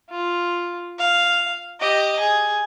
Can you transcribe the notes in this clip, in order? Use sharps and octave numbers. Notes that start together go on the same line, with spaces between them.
F4
F5
G4 D#5
G#4